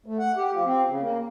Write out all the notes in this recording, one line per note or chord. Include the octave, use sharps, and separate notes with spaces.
A3
F#5
G4
F3
C4
C#3
A#3